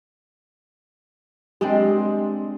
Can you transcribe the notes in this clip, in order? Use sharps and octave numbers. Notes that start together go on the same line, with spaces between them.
G#3 C4 D4 G4